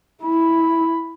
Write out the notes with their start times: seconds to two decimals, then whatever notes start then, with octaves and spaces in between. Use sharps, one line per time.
0.23 E4 B5